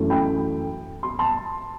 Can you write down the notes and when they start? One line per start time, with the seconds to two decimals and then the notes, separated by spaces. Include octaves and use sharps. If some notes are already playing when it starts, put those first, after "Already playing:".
Already playing: F#2 E3 A3
0.10 G5 B5
1.03 C6
1.19 A5 C6